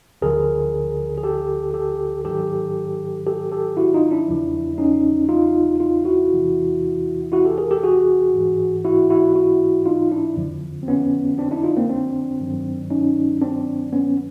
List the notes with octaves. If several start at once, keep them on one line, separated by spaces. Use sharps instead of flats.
D2 D3 F3 G#4 A#4
G#4
G4 A4
G4 A4
G#2 D#3 F#3 G4 A4
G4 A4
G4 A4
E4 F#4
D#4 F4
D4 E4
E2 C#3 F3
C#4 D#4
D#4 F4
D#4 F4
E4 F#4
E2 C3 E3
E4 F#4
G4 A4
G#4 A#4
G4 A4
F#4 G#4
G#2 E3
E4 F#4
E4 F#4
E4 F#4
D#4 F4
D4 E4
F2 D3 F3
C4
B3 C#4
C4 D4
D4 E4
D#4 F4
A#3 C4
C4 D4
G2 D#3 F#3
C#4 D#4
C4 D4
B3 C#4